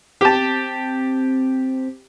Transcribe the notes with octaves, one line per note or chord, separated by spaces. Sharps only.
C4 G4 A5